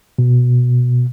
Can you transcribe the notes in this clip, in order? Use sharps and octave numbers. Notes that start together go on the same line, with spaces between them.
B2